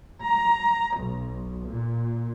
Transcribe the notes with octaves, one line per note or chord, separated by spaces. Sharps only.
A#5
B1
A#2